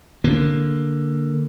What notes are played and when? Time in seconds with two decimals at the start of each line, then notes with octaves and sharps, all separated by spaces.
0.24 D3 A#3